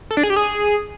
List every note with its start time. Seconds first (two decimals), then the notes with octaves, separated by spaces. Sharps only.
0.11 A4
0.17 D4
0.23 G#4
0.30 G4
0.36 G#4